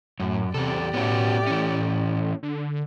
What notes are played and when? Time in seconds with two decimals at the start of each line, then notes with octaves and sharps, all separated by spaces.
0.20 F#2 A2
0.54 E2 C3 G4 A4 D5
0.94 A2 B3 C#4 F#4
1.47 E3 C#4
2.43 D3